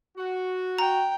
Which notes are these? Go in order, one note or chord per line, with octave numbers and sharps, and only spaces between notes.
F#4
G5 A#5